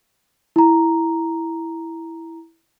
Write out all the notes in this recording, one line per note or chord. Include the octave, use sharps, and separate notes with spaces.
E4 A#5